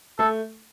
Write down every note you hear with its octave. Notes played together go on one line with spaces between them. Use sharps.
A3 A4